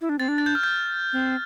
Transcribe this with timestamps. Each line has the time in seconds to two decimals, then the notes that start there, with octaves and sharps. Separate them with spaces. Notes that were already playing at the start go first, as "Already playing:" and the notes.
0.01 E4
0.09 D4
0.19 C4 A6
0.28 D4
0.38 A6
0.46 G6
0.55 F6
0.63 G6
1.13 C4